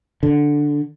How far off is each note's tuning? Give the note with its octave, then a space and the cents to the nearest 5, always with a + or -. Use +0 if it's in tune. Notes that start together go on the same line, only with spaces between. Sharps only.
D3 +0